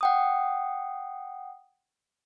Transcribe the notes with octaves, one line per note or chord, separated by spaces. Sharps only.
F#5 G5 D#6